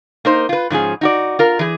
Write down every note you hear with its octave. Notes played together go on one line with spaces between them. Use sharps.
A#3 D#4 C5
F4 B4
G#2 F3 C#4 G#4
D#4 F#4 D5
F4 A#4
E3 G#4